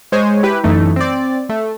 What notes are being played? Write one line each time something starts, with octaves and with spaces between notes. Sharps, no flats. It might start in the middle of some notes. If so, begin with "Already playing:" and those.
G#3 C5 C#5 G#5
E4 G4 B4
F#2 E3 A3 D#4
C4 D5
A3